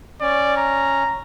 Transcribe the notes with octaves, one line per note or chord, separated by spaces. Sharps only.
C#4 D5
A#5